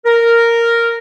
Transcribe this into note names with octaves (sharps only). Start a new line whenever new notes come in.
A#4